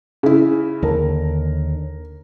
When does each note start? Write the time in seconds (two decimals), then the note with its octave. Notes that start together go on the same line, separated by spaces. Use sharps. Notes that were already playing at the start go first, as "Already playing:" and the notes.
0.23 C#3 E4
0.83 D#2 D3 A#4